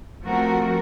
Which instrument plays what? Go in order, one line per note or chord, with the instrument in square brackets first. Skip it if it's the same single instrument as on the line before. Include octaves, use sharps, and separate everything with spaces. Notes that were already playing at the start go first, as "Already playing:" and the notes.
[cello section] F3 A3 C4 F#4 A#4